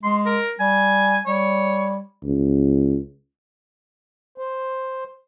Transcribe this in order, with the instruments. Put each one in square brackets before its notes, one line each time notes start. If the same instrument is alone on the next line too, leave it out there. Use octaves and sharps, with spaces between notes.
[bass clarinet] G#3 [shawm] C6
[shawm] A#4
[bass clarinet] G3 [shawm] G#5
[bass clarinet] G3 [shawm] C#5
[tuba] C#2
[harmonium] C5